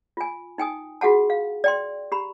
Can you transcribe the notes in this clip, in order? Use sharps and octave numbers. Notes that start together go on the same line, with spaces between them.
F4 G#5
D#4 G5 G#5 D#6
F4 F#4 G#4 F#5 A5
F5
D5 G5 C6
G4 A#5 B5